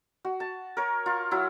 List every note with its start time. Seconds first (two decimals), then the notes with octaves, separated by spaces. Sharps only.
0.25 F#4
0.40 A5
0.77 A#4 C#5
1.06 F4
1.31 F#3 E4